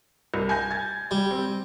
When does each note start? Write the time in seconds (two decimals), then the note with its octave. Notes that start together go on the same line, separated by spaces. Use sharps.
0.34 C2
0.49 G#5 G6 A#6
0.71 G#6 A6
1.11 G3
1.31 C4